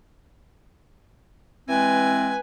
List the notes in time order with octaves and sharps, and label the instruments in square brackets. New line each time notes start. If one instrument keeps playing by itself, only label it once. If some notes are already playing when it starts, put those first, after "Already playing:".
[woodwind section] E3 G#3 C4 [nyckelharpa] B4 G#5